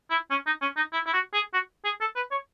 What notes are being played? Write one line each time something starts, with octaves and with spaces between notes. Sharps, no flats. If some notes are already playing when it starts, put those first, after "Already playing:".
E4
C#4
D#4
C#4
D#4
E4
E4
F#4
G#4
F#4
G#4
A4
B4
C#5